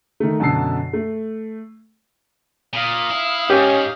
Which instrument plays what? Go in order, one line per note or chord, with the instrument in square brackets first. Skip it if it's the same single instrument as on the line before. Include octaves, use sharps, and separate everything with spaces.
[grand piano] D#3 A3
F#2 B2 D3 A5 E6 C7
A3
[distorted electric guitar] A#2 [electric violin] F5 D#6
[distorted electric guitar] E4
[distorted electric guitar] G#2 [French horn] C#4 [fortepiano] G4